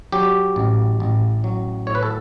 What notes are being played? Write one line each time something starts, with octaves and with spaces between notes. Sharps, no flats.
F#3 G4
A1
A1
F#3
A2 C#5
B4
A4